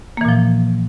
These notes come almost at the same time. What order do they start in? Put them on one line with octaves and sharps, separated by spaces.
A#3 E3 A#2 F3